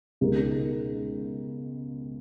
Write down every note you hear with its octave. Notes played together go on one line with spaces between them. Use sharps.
C#2 B2 G#3 D#4 A#4